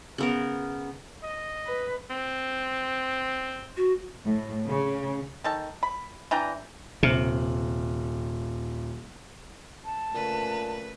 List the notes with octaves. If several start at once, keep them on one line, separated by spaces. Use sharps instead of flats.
C#3 B3 A#4
D#5
B4
C4
F#4
A2
C#3
D#3 A4 A5
B5
E3 D4 G5 A#5
D#1 C3 F6 F#7
A5
A#2 C#3 A3 B4